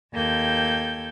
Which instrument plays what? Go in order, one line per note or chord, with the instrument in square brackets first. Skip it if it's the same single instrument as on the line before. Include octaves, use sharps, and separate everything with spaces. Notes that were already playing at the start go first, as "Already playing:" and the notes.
[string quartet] D#2 A#3 A4 G5 G6 G#6